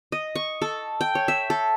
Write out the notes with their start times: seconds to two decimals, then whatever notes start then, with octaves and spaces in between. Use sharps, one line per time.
0.12 D#5
0.35 C#6
0.62 A4
1.01 G5
1.15 C#5
1.28 E5
1.50 A4